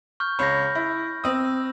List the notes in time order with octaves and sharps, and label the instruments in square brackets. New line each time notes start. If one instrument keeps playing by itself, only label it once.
[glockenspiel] C#6 F6 G6
[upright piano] C#2 C#5 [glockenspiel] B5 G6 A#6
[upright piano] E4
[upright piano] C4 D#6 [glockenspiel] E6